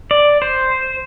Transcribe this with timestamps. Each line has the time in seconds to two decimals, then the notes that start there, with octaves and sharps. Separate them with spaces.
0.11 D5
0.42 C5